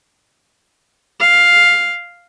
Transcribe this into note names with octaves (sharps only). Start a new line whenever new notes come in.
F5